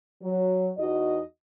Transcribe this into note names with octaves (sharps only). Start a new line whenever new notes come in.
F#3
E2 D#4 F#4 D#5